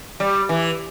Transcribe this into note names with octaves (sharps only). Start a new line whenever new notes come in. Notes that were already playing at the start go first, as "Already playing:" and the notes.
G3
E3